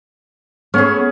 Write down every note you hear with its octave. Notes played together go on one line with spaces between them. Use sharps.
A3 B3 C#4 G#4